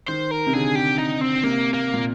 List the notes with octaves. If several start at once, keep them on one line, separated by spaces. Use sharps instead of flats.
D#3 C5
A#4
C3
D3 G#4
G4
D#4
C4
C3 A#3
A#3
A#2